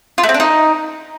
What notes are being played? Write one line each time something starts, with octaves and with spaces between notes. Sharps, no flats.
F4
A3
C4
D4
D#4